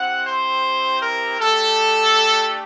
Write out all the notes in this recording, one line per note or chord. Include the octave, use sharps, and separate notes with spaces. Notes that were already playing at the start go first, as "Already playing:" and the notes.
Already playing: C4 E4 G4 F#5
C5
A#4
A3 D4 G4 A4